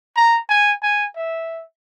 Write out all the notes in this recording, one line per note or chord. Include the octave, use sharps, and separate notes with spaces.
A#5
G#5
G#5
E5